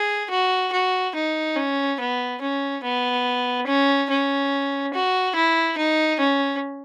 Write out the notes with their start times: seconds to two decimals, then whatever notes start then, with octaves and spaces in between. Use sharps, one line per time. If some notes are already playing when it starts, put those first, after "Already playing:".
Already playing: G#4
0.30 F#4
0.72 F#4
1.15 D#4
1.56 C#4
1.99 B3
2.41 C#4
2.84 B3
3.67 C#4
4.10 C#4
4.93 F#4
5.35 E4
5.78 D#4
6.20 C#4